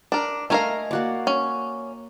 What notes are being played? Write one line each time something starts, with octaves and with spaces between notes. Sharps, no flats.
D4 A#4
A3 A#4 D#5 F5 G#5 A#5
A#3 F#4 D5
C#4